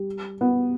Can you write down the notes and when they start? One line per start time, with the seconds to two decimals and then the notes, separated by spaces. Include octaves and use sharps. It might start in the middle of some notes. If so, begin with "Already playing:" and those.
Already playing: G3
0.41 B3